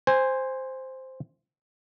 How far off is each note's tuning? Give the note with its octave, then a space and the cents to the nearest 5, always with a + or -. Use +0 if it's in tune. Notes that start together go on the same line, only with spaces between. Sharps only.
C5 +0 G#5 -20